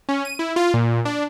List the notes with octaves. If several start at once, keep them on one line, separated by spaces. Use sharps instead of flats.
C#4
D#7
E4
F4
A#2
D4